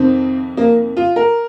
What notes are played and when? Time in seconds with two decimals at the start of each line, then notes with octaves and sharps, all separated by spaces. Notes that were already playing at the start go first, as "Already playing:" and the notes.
Already playing: F2 C3 D#3 C4
0.57 A#3
0.97 F4
1.16 A#4